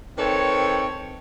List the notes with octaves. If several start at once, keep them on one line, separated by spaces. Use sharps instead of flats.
D#3 C4 A4 B4 C#5 G5